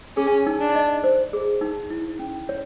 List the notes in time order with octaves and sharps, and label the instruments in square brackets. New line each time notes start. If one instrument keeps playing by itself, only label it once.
[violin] C#4 [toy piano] G#4
[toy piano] D#4
[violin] D4
[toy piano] D#5
C5
G#4
D#4
E4
C#4
C#5